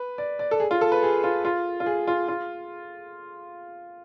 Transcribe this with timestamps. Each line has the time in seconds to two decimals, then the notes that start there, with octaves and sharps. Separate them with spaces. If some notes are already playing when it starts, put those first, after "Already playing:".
Already playing: B4
0.18 D5
0.39 D5
0.51 A4
0.60 G#4
0.71 F4
0.81 A4
0.92 B4
1.03 G#4
1.24 F4
1.45 F4
1.80 F4
1.86 G#4
2.07 F4
2.28 F4